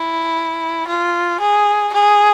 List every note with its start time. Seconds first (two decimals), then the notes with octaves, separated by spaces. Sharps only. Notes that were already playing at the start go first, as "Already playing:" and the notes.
Already playing: E4
0.87 F4
1.40 G#4
1.93 G#4